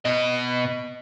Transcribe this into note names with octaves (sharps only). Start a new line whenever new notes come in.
B2 D#5